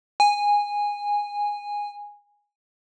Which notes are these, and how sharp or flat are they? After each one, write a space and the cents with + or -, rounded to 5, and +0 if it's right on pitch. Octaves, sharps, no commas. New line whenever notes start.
G#5 -15